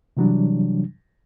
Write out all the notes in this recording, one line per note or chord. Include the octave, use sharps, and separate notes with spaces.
C3 E3 F#3 G3 D4